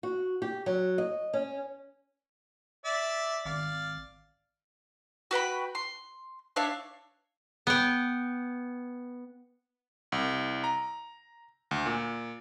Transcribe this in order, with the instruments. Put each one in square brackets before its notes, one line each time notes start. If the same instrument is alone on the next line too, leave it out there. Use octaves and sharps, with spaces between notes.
[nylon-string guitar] F#4
G4
F#3
D#5
C#4
[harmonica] D5 E5
[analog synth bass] G#1 [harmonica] D5 F5
[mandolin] F#4 B4 G5 B5
C6
D4 C#5 E5 F5
[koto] B3 G5
[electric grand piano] C2
A#5
D2
A#2